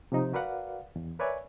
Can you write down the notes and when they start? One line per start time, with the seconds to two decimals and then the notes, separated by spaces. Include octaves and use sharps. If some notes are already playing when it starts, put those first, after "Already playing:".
0.12 C3 F3 D#4
0.33 F#4 A#4 B4 D5 F5 F#5
0.96 E2
1.19 A#4 B4 C#5 D5 E5 G#5